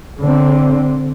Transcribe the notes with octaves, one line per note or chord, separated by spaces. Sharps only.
D3 C4